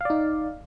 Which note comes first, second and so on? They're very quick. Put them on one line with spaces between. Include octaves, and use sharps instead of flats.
F5 D5 D#4